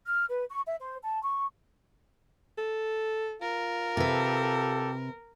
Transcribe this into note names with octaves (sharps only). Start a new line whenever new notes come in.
F6
B4
C#6
E5
C5
A5
C#6
A4
F4 A#4
C3 G4 A4 B4